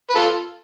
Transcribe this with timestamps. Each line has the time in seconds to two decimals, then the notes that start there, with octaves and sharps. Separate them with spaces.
0.10 B4
0.15 F4 A4